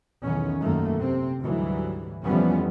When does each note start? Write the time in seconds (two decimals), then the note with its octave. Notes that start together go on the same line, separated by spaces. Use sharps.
0.22 B1 E2 D#3 C#4
0.61 F#2 D#3 A3 A#3
0.97 C3 C4
1.40 D2 G#2 E3 F#3 G3
2.23 F2 E3 F3 G3 B3 C#4